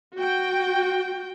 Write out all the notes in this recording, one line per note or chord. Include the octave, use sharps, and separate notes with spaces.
F#4 G5